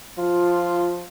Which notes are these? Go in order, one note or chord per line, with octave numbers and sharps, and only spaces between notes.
F3 F4